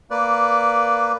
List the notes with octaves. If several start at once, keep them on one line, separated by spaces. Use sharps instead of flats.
A#3 B4 D5